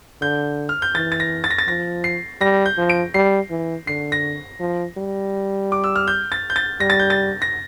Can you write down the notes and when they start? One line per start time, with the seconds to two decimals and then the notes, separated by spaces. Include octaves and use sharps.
0.22 D3 G6
0.69 F6
0.82 G6
0.95 E3 A6
1.12 A6
1.20 A#6
1.44 A6
1.50 A#6
1.58 A6
1.67 F3 A#6
2.04 C7
2.41 G3 A#6
2.66 G6
2.77 F3
2.90 D7
3.14 G3 C7
3.50 E3
3.87 D3 C7
4.12 A#6
4.60 F3
4.97 G3
5.72 D6
5.84 E6
5.96 F6
6.07 G6
6.32 A6
6.50 G6
6.56 A6
6.80 G3 A#6
6.90 A6
6.99 G6
7.10 A6
7.42 A#6